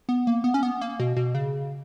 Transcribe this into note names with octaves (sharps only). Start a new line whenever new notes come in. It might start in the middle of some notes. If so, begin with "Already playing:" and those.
B3
A#3
B3
C#4
B3
A#3
B2
B2
C#3